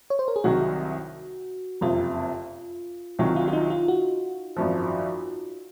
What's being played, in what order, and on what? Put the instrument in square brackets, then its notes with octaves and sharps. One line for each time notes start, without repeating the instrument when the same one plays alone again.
[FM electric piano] C#5
C5
A#4
G#4
[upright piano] C2 C3 D#3 F#3 [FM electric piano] F#4
[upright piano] F#1 F2 C3 [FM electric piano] F4
[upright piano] C2 C3 D#3 F#3 [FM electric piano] F4
[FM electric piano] F4
F4
D#4
F4
F#4
[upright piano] G#1 F#2 F3